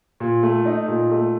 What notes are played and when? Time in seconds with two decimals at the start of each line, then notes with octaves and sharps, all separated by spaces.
0.20 A#2
0.43 A3
0.66 D#4
0.88 A#2
1.11 A3